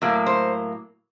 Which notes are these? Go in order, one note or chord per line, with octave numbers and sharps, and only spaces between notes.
A2 F#3 A#3
C5